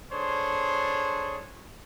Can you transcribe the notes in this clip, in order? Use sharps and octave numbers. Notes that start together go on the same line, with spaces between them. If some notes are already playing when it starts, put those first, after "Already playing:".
D4 G#4 A4 C5 C#5